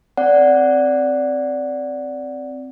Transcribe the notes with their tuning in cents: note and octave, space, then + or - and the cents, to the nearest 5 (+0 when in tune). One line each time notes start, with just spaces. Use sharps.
C4 +0 D5 -10 F#5 +0